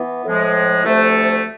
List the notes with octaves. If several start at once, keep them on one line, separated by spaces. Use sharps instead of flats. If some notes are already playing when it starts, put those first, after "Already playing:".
Already playing: E3 B3
A2 F3 G#3
D2 C3 F3 A3